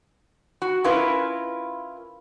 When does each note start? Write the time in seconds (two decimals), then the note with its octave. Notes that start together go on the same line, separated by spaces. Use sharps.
0.62 F#4
0.84 C#4 E4 F4 A#4 B4